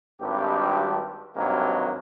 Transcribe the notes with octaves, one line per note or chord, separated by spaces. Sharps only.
G#1 G2 G4
G#1 G2 C3 D#3 F#3 A#3